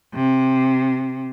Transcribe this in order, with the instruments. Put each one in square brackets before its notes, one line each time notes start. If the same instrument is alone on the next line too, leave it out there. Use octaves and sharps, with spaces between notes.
[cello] C3